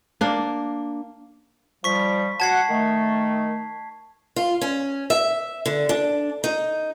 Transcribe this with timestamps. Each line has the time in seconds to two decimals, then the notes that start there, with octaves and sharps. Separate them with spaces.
0.21 A#3 D4
1.84 F3 G3 C#6 B6
2.40 F#4 F#5 A5 G#6 C7
2.69 D#3 A3
4.36 F4
4.61 C#4
5.10 E5
5.66 D3
5.89 D4
6.44 D#4